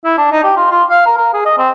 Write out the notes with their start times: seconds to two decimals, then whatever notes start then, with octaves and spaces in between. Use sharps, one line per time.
0.04 E4
0.18 D4
0.31 D#4
0.44 G4
0.56 F4
0.71 F4
0.90 F5
1.06 A#4
1.18 A#4
1.33 G#4
1.45 D#5
1.58 C4